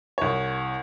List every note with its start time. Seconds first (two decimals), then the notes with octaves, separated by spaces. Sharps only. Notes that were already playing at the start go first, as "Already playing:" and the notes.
0.18 C2 C#5